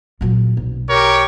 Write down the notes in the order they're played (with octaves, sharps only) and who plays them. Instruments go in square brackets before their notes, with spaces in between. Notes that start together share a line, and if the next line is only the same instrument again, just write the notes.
[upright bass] A#2 F#3
B1
[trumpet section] G4 A#4 C#5